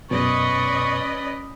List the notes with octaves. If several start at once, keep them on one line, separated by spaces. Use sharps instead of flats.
F#2 B2 C#4 B4 D5 D#5 C#6